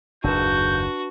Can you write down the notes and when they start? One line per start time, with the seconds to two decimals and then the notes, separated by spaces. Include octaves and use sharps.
0.24 F#1 D#2 G#2 D4 F#4 B4 G6